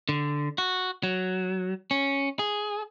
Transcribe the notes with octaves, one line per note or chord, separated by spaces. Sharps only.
D3
F#4
F#3
C#4
G#4